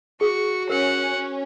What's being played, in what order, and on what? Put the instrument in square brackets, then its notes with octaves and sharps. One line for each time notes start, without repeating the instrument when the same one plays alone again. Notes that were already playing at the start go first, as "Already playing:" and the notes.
[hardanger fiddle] F#4 [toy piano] G#4 [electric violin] C#6
[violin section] C#4 [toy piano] A#4 [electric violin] F#5